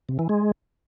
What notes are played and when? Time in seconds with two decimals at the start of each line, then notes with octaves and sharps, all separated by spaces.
0.09 C3
0.19 E3
0.29 G#3